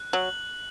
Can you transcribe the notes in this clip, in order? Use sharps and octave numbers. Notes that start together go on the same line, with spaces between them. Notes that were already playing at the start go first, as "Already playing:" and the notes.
Already playing: F#6
F#3 F#7